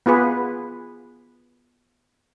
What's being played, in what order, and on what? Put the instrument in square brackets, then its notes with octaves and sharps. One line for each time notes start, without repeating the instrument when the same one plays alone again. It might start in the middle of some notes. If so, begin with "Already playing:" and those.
[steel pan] B3 F4 G#4 B4